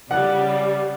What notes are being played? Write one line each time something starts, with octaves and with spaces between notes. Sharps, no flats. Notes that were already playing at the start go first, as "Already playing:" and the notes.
C#3 G3 D5 F#5